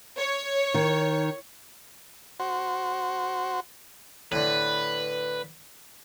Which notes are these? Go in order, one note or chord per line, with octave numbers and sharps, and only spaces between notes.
C#5
D#3
F#4 C5
A2 D3 B4